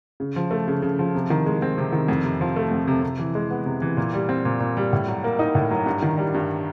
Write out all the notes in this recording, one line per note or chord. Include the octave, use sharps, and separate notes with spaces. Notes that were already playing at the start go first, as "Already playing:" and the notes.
C#3
F3
A3
C#3
C#3
F3
C3
D#3
G#3
C4
C3
D#3
F2
C3
F3
A3
F2
C3
C3
E3
G#3
B3
C3
E3
A#2
G3
C4
A#2
A#2
G3
A2
F#3
A#3
D#4
A2
F#3
G2
D#3
G3
G2